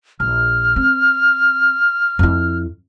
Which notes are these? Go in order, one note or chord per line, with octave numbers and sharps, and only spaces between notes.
A#1 F6
C4
F2 E4